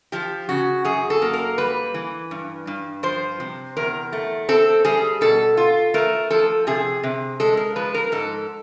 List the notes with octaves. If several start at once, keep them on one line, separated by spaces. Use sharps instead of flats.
F3 G4
C#3 F#4
F#2 G#4
A4
A#3
A#4
G3 B4
E3
G2
G2
F3 C5
C3
E2 A#4
A3
C4 A4
G3 G#4
B2 A4
F4
A3 A#4
F3 A4
C3 G#4
C3
G#3 A4
A#4
F3 B4
A#4
G#2 A4